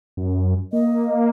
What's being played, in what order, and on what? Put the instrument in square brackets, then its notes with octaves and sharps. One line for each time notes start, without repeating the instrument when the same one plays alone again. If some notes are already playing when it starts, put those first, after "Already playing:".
[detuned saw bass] F#2
[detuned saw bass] A#3 [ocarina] D#5